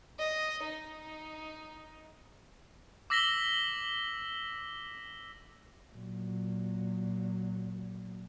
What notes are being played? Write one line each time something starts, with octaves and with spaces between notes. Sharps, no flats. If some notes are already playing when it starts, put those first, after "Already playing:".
D#5
D#4
D6 E6 A#6 B6 F#7 G7
A#2 F#3